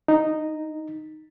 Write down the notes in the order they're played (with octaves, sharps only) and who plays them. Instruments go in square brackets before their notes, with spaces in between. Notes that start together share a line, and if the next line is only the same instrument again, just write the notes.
[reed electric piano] D#4